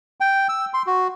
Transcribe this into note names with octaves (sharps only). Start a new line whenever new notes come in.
G5
E6
C6
F#4